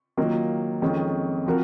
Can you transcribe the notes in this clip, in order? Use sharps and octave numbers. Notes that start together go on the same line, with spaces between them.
D#3 F#3 A#3 F4
F2 D#3 G#3 C#4
F3 C4 F#4 A#4